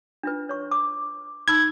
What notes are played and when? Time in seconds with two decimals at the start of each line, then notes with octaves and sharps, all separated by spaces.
0.23 D4 F4 B4
0.49 C#5 C#6
0.71 D6
1.48 D#4 B5 E6 G#6